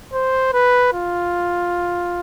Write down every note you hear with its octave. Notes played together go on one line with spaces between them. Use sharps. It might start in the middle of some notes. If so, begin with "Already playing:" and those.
C5
B4
F4